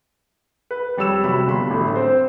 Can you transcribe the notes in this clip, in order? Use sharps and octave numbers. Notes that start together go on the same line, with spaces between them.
B4
F2 G3 C#5 E6 E7
C3 F#3 B5
G1 B5 C6
A1 D3
C4 C5